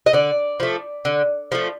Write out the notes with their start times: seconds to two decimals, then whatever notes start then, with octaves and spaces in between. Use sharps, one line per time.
0.06 D#5
0.13 D3 D5
0.60 F3 A3
1.05 D3
1.52 F3 A3